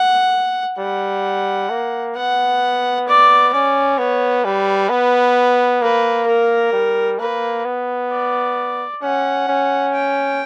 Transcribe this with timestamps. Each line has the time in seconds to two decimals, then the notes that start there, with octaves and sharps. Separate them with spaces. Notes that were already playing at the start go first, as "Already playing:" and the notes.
Already playing: F#5
0.78 G3 F#5
1.70 A#3
2.16 B3 F#5
3.07 D5
3.53 C#4 D5
3.98 B3 C#5
4.44 G3 B4
4.90 B3
5.82 A#3 B4
6.27 A#4
6.73 G3
7.19 A#3 B4
7.65 B3
8.11 D5
9.02 C#4 F#5
9.48 C#4
9.94 G5